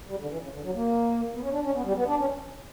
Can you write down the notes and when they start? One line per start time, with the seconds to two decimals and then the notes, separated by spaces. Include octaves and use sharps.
0.08 G3
0.19 D3
0.30 E3
0.41 C#3
0.53 D3
0.63 F#3
0.74 A#3
1.35 B3
1.42 C#4
1.52 D4
1.63 C#4
1.74 B3
1.85 G3
1.96 B3
2.07 D4
2.19 C#4